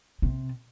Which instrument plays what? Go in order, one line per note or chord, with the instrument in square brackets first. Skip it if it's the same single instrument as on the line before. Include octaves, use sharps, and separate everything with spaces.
[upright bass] C3